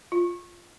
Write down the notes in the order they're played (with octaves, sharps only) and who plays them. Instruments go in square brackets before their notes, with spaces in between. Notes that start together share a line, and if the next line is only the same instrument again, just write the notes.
[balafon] F4